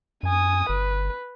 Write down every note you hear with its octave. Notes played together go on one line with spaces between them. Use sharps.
F#2 G#5 D#6
G1 B4